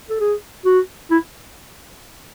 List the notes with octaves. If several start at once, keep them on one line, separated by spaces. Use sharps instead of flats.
A4
G#4
F#4
E4